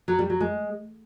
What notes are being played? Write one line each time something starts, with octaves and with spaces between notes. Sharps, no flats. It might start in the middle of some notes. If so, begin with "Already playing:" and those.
F#3
G3
F#3
G#3